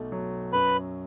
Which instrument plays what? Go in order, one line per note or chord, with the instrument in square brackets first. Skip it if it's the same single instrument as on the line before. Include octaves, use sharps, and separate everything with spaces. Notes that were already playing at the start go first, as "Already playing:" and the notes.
Already playing: [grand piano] B1 B2 A3
F#3
[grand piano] F#2 [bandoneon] B4 B5